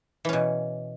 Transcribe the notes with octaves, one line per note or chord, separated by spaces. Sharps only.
B2 E3 C#4